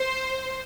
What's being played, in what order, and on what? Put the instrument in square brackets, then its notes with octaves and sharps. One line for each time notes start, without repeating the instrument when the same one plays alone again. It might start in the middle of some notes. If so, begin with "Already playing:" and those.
Already playing: [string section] C5